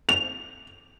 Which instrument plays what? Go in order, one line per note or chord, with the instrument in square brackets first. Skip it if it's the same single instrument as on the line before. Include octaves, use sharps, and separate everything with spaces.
[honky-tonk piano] F7